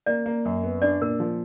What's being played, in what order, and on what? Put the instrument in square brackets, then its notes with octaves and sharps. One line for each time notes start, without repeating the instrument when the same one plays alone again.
[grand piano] A#3 [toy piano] D5
[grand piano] A#3
F#2
B3
[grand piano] D4 [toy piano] D5
[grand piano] A#2 [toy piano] A#4
[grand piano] F3